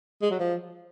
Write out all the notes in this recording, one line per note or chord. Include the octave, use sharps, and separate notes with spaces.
G#3
F#3
F3